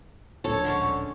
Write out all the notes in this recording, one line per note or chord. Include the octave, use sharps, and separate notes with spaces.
D1 A#1 A4 C#5 A5
D3 G#3 C#4